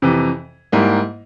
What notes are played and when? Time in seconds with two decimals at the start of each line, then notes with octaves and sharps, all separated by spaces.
0.02 F2 C3 E3
0.72 G#2 G3 A#3 E4